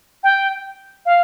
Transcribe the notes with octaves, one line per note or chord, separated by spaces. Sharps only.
G5
F5